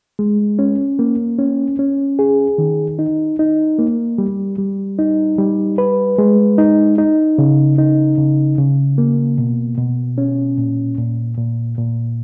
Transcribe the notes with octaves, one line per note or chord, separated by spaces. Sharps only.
G#3
C#4
A#3
C#4
C#4
G#4
D#3
D#4
D#4
A#3
G3
G3
D#4
G3
B4
G#3
D#4
D#4
C#3
D#4
C#3
C#3
A#3
B2
B2
C#4
A#2
A#2
A#2
A#2